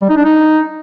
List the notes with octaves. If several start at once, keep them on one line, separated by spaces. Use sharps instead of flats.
G3
D#4
D4
D#4